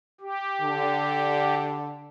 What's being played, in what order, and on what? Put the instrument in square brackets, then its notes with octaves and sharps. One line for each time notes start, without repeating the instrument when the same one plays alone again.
[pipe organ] G4
[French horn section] D3